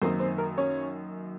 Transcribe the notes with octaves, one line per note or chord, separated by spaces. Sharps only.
F#2 D#3 A#3 C4 D#4 C5
C4 C5
A#4
C#4 C#5